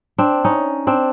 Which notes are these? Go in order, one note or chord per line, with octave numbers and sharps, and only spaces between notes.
C4 D4
C#4 D#4
C4 D4